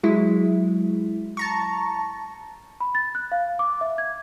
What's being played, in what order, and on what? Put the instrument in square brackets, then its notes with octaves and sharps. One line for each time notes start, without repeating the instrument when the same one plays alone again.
[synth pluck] F#3 G#3 E4
A5 A#5 C#6
[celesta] B5
A6
F#6
F5
D6
E5
G#6